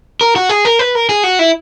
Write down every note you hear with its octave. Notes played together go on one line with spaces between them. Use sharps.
A#4
F#4
G#4
A#4
B4
A#4
G#4
F#4
E4